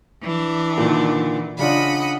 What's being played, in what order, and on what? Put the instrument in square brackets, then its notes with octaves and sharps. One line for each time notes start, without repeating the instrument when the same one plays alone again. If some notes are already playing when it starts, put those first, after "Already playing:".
[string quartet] E3 D4
[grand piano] A#2 D3 D#3
[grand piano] C#3 D4 F4 [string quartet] D#5 F#5 B5